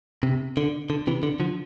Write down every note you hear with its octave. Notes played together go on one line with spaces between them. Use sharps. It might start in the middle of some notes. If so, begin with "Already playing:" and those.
C3
D3
D3
C3 E3
D3
D3 F3